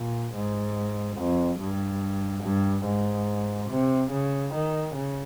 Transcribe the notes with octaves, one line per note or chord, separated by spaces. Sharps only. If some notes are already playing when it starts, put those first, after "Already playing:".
Already playing: A#2
G#2
F2
G2
G2
G#2
C3
C#3
D#3
C#3